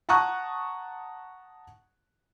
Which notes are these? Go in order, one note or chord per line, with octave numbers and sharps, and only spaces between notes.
F#5 A5 A#5 C#6 D#6 F#6